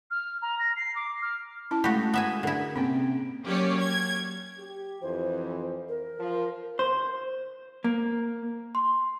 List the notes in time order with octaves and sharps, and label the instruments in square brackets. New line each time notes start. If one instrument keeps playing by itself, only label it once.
[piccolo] F6
A#5
A#6
C7
D6
F6
[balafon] C#4 E4 A5
[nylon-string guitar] G#3 A3 F5 [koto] F#4 G4 [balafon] B5
[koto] B3 E5 G#5
[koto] D3 E4 [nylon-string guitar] G#4 A#4 F#5
[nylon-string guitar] C3 G5 [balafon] A#3 C4 C#4
[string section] F#3 A#3 C#4 G4 C#5 D5
G#6
[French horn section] G4
[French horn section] F2 E3 [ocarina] C5
[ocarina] A#4
[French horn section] F3
[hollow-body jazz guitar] C5
A#3
[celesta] C6